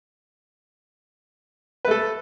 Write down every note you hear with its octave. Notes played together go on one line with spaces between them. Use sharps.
A3 A4 B4